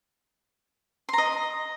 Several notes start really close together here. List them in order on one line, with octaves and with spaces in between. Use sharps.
C6 A#5 D#5